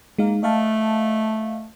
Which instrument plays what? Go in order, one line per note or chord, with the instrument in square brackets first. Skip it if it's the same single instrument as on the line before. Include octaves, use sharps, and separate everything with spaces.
[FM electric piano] G#3 D#4 F5 [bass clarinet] A#3
[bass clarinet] A3 [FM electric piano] D#5 F5 A5